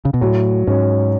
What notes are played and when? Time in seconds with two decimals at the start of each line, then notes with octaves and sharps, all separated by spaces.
0.05 C#3
0.14 B2
0.21 A2 F#3
0.67 G#2 C#4